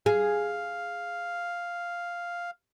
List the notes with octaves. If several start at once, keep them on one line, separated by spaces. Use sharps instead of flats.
G#4 F5